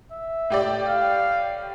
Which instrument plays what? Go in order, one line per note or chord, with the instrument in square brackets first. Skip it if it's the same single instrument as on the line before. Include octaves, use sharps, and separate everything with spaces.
[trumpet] E5
[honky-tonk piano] A2 G4 D5
[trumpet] F5